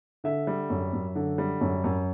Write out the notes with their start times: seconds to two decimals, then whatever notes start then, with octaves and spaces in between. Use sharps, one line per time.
0.24 D3 E5
0.47 G3
0.70 F#2
0.93 F#2
1.15 D3
1.38 G3
1.61 F#2
1.84 F#2